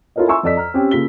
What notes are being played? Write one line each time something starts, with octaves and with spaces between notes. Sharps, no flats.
E4 F4 A4 A#4 C#5 D#5
E5 G#5 A#5 C6 C#6 E6
F2 A4 D5 D#5 E6 B6
A#5 F6
C4 C#4 G4 G5
C#3 A#3 F4 B6 G7